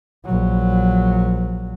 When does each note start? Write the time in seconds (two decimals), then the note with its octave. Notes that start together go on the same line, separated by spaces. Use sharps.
0.25 A#1 F#3